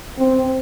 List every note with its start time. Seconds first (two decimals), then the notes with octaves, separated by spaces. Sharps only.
0.18 C4